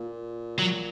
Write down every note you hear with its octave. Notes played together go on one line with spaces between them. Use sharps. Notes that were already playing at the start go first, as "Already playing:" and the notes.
Already playing: A#2
F#3